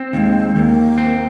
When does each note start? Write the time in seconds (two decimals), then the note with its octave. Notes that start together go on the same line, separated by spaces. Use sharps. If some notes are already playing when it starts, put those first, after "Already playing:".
Already playing: C4
0.13 D#2 G#3 A#3
0.55 D#2 A#3
0.98 C4